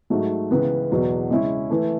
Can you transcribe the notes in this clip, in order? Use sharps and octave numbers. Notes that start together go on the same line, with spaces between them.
G#2 F#3 A3
C#2 C#3 E3 B3
E2 B2 F#3 B3
C#3 G#3 C#4 E4
E3 A3